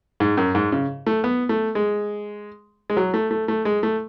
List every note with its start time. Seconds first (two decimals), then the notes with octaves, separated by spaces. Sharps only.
0.20 G#2
0.37 F#2
0.55 G#2
0.72 C#3
1.06 A3
1.24 B3
1.49 A3
1.75 G#3
2.90 G#3
2.97 F#3
3.14 A3
3.31 A3
3.48 A3
3.65 G#3
3.83 A3